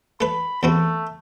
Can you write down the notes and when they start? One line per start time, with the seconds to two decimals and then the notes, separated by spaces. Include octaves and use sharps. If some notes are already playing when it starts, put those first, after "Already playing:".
0.21 A3 B4 B5
0.63 E2 A3 C4 F#4